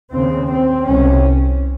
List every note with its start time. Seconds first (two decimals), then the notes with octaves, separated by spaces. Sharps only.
0.12 D#2 C#3 C4
0.50 C4
0.86 C2 C3 C#4